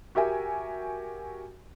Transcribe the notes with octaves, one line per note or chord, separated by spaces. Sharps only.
F#4 G4 A#4 E5 G#5